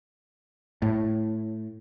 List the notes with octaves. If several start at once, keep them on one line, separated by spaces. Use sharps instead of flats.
A2